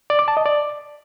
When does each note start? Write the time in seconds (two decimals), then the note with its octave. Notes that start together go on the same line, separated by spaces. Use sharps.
0.10 D5
0.19 D6
0.28 A5
0.37 D#5
0.46 D5